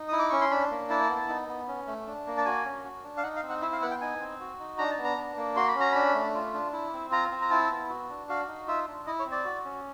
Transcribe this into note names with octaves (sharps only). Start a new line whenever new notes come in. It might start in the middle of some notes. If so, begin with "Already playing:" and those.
Already playing: D#4
E4 D#6
D6
C#4 C#6
C6
D4 B5
A#3
E4 A5
B3
D#4
B3
C#4
A3
D4
A#3
A5
F#4 G#5
C#4
F#4
D4
F5
D#4 F#5
F5
C4
F#5
E4 E5
F5
B3 F#5
G5
D#4 G#5
C4
F#4
D#4
D4 A#5
A5
B3
A#5
D4
A#3
F#4 C6
B5
C#4
A#5
D4 B5
A3
F4
D4
E4
C4
F4 A#5
C4
A#5
E4 A5
B3
F#4
D4
F#4 F5
D#4
F4 E5
D4
E4 D#5
C#5
C4
D5
F#4
C#4